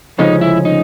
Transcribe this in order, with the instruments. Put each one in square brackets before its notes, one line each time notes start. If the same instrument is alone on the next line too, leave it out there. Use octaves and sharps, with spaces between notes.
[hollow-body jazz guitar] D2 C#3 F3 G#3 C#4 [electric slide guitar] D#4
[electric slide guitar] E4
D#4